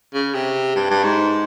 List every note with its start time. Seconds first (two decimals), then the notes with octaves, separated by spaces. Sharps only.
0.14 C#3
0.34 C3
0.76 G2
0.90 G2
1.04 G#2